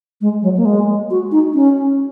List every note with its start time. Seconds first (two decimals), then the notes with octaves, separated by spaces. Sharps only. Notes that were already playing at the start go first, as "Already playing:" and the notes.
0.21 G#3
0.42 F#3
0.57 A#3
0.65 G#3
1.10 F#4
1.32 D#4
1.54 C#4